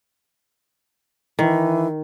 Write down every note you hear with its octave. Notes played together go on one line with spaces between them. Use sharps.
D#3 E3